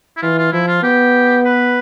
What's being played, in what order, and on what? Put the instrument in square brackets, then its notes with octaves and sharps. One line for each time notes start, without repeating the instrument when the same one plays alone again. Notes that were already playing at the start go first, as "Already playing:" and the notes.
[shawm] E4
[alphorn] E3 [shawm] F4
[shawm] F4
[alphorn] F3 [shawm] E4
[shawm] F4
[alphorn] B3 [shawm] G4
[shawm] B4